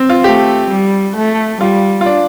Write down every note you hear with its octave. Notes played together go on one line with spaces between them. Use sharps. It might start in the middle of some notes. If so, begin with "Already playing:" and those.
Already playing: C4
F4
A3 G4
G3
A3
G3 F4
F4
D4